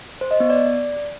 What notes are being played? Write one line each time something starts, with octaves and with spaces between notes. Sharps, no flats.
C5
D#5
B3
D5